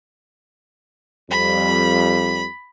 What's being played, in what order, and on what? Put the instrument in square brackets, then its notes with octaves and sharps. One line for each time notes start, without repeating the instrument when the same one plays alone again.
[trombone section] F2 G3 [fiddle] B5